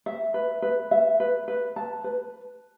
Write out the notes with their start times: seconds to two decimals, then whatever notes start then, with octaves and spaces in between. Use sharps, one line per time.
0.06 E5
0.34 B4
0.62 B4
0.91 E5
1.20 B4
1.48 B4
1.76 A5
2.04 B4